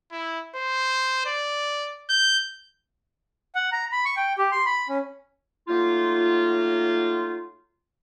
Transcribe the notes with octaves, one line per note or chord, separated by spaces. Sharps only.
E4
C5
D5
G6
F#5
A#5
B5
C#6
G5
G4
C6
B5
C#4
F#3 A3 A#3 D#4 F4